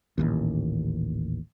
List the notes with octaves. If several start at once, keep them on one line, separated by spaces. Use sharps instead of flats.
D#1 A1 D#2